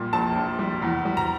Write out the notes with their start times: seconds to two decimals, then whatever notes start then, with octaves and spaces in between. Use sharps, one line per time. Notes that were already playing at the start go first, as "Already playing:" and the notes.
Already playing: A#1 A#2 G3
0.13 A#1 A5
0.36 A#1
0.59 G3
0.82 E2
1.05 G3
1.17 A#5